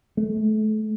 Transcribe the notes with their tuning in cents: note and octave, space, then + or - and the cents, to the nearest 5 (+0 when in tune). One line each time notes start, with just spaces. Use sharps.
A3 -30